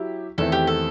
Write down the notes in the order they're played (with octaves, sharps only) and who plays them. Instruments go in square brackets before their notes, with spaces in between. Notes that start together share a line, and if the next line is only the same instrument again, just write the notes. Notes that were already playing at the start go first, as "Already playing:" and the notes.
Already playing: [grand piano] F#3 E4 G4
[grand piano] E2 D#3 A3 C4 E4 [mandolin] A4
[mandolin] G4
A4